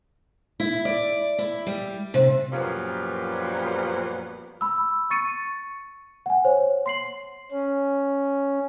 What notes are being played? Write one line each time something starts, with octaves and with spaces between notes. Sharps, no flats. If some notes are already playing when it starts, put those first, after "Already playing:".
E4
D5
E4
G3
C3
F#2 A#2 F3 G3 B3
B5 E6
C#6 A6 C#7 D#7
F#5 G#5
C5 C#5
C6 C7 F#7
C#4